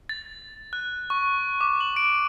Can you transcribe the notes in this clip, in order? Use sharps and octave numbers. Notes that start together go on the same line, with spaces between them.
A6
F#6
C#6
D6
F#7
D7